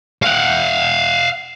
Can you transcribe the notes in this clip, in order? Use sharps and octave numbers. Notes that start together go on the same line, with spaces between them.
F5 F#5